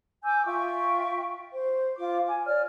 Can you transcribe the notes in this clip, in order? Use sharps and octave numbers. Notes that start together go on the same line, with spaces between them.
G#5 D6 E6 G6
F4 E5 G5 C#6
C5
F4 D6
G#5
C#5 D5 F6